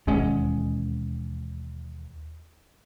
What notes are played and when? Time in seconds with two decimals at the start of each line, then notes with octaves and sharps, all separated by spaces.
0.07 E1 D#2 G#3 C#4